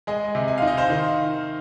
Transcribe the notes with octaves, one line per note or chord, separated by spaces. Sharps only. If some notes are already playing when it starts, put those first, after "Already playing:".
G#3 D#5 G#5
C3
G#5
D#4 F5
D#5
C5 F5
D#3